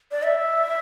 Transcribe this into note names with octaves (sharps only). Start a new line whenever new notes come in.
D5
E5